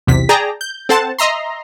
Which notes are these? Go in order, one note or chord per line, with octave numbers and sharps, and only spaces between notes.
B1 E2 C3 B6
G#4 D5 G5 A5 A#5
G6
C4 A4 C5 F#5 A5
D#5 E5 A#5 C6